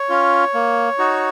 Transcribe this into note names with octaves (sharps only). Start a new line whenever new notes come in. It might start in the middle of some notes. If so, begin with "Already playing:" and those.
Already playing: C#5
C#4 F4
A#3
D#4 F#4